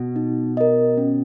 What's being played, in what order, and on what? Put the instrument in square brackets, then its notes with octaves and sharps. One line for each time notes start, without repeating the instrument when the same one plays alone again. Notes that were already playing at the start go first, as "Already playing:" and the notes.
Already playing: [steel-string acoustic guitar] B2
[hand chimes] D#4
A#4 D#5
C#4